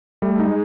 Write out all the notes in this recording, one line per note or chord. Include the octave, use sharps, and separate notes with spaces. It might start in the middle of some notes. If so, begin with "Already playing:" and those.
G3 A3
D#4
G#3